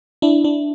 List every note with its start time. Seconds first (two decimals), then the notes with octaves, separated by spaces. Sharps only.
0.22 D4 E4
0.44 D4